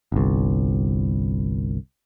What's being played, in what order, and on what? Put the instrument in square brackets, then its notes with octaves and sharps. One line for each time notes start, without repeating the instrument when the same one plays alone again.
[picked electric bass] G1 C2